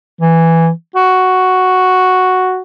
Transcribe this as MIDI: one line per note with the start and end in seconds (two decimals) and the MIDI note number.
0.21 0.69 52
0.96 2.62 66